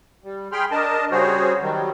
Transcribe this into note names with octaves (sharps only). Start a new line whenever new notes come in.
G3
G#4 G5 B5 C6 F6
D4 A#4 D#5 A5
C#3 G3 F#4 G#4 C5 C#5
D#3 F#3 G3